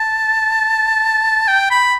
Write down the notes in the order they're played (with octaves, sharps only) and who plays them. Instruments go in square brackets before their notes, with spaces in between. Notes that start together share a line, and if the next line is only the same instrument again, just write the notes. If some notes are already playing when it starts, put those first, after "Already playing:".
Already playing: [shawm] A5
G5
B5